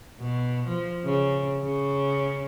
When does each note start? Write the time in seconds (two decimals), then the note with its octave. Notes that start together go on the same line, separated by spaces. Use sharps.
0.20 B2
0.67 F3
1.05 C#3
1.63 C#3